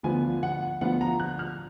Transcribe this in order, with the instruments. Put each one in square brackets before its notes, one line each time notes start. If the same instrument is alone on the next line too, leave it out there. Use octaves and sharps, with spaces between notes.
[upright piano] D2 D3 F3 B3 F4 G#5
F#5
D2 D3 F3 B3 F4 F#5
A#5
F#6
F6